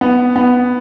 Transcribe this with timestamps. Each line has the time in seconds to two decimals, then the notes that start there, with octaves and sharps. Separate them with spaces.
0.01 B3
0.36 B3